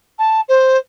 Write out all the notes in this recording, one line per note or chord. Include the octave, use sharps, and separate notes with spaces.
A5
C5